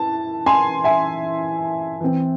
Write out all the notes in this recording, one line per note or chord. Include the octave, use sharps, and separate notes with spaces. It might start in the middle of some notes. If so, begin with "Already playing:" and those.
Already playing: E3 A5
G#5 C6
E5 G#5
E3 C4